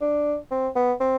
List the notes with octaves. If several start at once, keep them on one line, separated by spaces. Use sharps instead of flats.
D4
C4
B3
C4